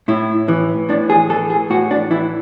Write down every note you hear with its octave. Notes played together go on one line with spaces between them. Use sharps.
A2 E4
E3
A2 D4
G#4
E3 A4
G#4
A2 F#4
D4
E3 E4